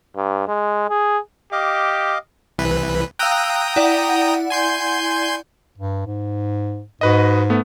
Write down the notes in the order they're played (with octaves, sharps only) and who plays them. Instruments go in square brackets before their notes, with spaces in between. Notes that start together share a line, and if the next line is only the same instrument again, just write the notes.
[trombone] G2
G#3
G#4
[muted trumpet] G4 [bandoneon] D#5 F5 D6
[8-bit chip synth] C2 E3 B4
[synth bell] F5 E6 F#6 [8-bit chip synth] G5 A#5 D#6
[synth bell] E4 D5 F#5
[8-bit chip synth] G#5 C6 G6
[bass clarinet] G2
G#2
[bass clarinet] G#2 [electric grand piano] F#4 B4 D#5
[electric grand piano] A3 B3